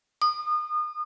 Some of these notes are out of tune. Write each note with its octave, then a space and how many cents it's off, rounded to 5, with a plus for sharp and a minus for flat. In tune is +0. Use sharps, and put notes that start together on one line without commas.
D#6 -30